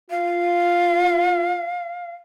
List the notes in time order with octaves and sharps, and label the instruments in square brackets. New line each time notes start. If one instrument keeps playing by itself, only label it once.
[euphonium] F4 [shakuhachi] F5